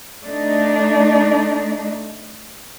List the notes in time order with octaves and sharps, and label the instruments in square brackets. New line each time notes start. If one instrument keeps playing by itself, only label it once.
[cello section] A3 D4 D#4